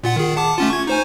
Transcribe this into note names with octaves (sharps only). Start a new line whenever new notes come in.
A#2 F4 F#5
D#3 G#4
F#5 A5 D6
A3 C#4 F4
C#6 G#6
D#4 C5 G#5